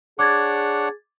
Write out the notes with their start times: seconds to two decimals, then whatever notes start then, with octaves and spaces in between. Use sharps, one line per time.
0.19 D4 G#4 C#5 F#5 D6 G#6 A6